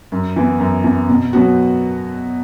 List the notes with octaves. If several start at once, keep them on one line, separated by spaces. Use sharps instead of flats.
F#2
E3 B3
F#2
E3 B3
B2
F#3 B3 F#4